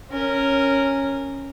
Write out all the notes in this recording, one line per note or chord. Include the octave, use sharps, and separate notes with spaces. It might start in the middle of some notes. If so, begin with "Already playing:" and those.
C#4 A#4